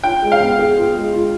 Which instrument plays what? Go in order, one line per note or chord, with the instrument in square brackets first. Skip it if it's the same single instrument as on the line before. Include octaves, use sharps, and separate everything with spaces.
[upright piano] F4 [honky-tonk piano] G5
[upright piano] G#3
[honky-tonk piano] F5
[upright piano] B3
G#4
F4
G#3
F4